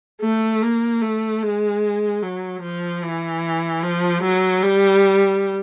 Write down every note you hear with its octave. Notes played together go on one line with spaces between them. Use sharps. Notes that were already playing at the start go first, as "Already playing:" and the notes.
A3
A#3
A3
G#3
F#3
F3
E3
F3
F#3
G3